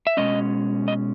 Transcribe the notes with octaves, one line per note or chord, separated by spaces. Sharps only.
E5
B2 G#3 C#4 D#5
D#5